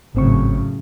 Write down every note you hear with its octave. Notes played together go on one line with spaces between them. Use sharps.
G#1 F#2 A2 C#3 C4 C#6